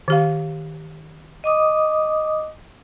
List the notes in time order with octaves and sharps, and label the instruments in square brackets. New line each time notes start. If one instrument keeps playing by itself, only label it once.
[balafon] D#3 G4 F5
[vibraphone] D#5 D6 D#6